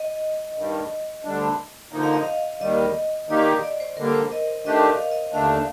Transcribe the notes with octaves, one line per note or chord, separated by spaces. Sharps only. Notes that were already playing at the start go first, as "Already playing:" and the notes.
Already playing: D#5
G2 D#3 G3
D2 D3 G3 D4
D3 F3 A#3 D#4
F5
D#5
F5
D#2 D#3 G3 D#5
D#3 A#3 D#4 G4 D5
D5
C5
D3 G3 A#3 A#4
C5
D#5
D#3 A3 D4 G4 D#5
F5
F5
D#5
D#2 D3 A3 D4 F5